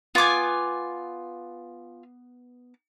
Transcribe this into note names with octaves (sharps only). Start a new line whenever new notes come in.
B3 F4 G#5 D6